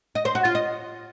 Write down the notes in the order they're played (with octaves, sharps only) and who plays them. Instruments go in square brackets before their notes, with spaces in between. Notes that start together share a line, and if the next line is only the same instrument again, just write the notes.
[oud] D#5
C5
F#4
F4
D#5